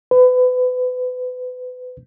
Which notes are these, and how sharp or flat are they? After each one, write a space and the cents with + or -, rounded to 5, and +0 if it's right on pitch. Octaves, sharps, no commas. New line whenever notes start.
B4 +30